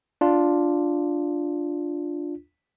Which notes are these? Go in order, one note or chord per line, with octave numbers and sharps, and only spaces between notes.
D4 F4